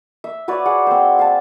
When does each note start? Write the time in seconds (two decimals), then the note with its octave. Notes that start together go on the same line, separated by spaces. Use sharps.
0.24 E5
0.48 F#4 B4 C#5 D5
0.65 G#4 F#5
0.87 C4 C5
1.19 F5 A5